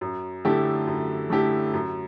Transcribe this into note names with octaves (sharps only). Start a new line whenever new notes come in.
F#2
D3 A3 E4 G4
F#2
D3 A3 E4 G4
F#2